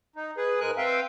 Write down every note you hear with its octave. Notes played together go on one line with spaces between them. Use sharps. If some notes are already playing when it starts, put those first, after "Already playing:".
D#4
G#4 B4
G#2 G#3 A#4 G#5 F#6
C4 B4 E5 F5 G5